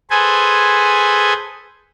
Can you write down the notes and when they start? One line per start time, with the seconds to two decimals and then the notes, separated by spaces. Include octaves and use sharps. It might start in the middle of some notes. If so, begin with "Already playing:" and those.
0.10 G#4 A4 B4 C5 G#5